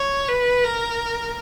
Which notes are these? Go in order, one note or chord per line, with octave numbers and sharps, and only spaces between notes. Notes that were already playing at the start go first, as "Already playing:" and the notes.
Already playing: C#5
B4
A#4